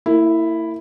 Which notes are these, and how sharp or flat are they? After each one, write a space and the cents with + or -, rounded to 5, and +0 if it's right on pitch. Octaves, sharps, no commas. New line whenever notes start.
A#3 -40 E4 +0